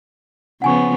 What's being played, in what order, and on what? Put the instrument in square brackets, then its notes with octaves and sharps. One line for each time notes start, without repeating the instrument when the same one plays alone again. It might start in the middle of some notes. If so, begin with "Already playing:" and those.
[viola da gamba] C#3 F3 B3 [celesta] F#5 G#5 C#6